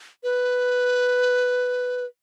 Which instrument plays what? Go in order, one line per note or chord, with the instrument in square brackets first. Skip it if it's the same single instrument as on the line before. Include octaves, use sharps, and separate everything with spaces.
[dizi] B4